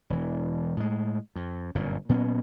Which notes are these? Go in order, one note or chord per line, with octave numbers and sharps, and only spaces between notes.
E1 E3
A2 G#3
F2
G1 F#2 A#2
A#2 F#3 B3 C#4